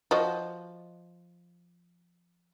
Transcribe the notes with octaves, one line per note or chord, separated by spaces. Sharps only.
F3 F#4 D#5